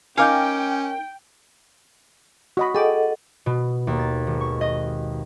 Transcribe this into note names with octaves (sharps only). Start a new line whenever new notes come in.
C#4 D#4 A#4 F5 G5 G#5 D6 G6
F#4 D#5 B5
G#4 A4 D#5 F#5 G5 D6
B2
D#2
A6
G#1
C#6
D#5